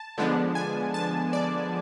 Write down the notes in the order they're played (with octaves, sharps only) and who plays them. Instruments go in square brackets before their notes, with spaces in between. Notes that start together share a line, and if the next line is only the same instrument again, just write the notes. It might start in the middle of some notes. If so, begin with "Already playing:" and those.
Already playing: [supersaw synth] A5
D3 F3 G#3 B3 D4
G#5
A5
D5